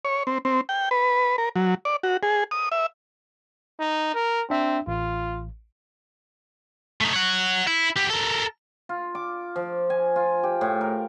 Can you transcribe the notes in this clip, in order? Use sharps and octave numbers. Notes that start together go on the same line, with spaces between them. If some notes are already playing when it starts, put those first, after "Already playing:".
C#5
C4
C4
G5
B4
A#4
F#3
D5
F#4
G#4
D#6
E5
D#4
A#4
C4 D4 E5
A1 F4
A3 D#4
C#5 F#5
E4
B3 G4
A4 A#4
F4
D6
F3
G#5
F4
G4
A2
A#4